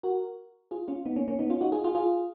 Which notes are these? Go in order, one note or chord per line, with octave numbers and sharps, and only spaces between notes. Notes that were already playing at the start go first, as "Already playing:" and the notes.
F#4 A#4
F4 G#4
C#4 F4
B3 D#4
A#3 C#4
A#3 C#4
B3 D#4
C#4 F4
D#4 F#4
F4 G#4
F4 G#4
F4 G#4